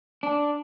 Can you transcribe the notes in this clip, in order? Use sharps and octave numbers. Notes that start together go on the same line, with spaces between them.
D4